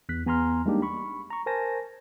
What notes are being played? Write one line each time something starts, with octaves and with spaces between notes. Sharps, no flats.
E2 F#6 B6
E2 B3 G#5 A#5 C6 F6
G3 G#3 A#3 D4 D#4 G4
B5 C#6
A#5 C#6
A#4 C5 G#5 A5 A#6